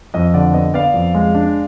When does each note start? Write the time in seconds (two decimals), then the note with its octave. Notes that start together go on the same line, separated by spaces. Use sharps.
0.14 F2 D#5
0.34 D3 D5
0.54 B3 D#5
0.74 B3 D5 F5
0.94 F2
1.15 G#3
1.35 D4